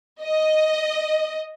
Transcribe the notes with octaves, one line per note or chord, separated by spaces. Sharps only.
D#5